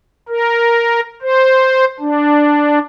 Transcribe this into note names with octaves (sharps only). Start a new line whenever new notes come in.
A#4
C5
D4